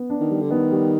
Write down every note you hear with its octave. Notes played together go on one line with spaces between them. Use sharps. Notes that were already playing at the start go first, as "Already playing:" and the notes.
Already playing: B3
D4
D#3
G3
D3
D#3 B3
G3